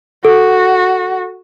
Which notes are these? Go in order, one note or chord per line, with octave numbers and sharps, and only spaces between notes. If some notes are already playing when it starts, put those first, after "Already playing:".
F#4 A4